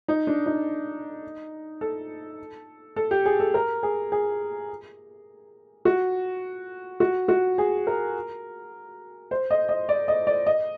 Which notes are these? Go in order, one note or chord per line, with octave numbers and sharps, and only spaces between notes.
D#4
D4
D#4
A4
A4
G4
G#4
A4
A#4
G#4
G#4
F#4
F#4
F#4
G#4
A#4
C5
D#5
D#5
D5
D#5
D5
D#5